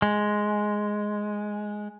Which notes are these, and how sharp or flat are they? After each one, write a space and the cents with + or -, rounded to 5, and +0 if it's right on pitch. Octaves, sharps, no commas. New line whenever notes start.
G#3 +5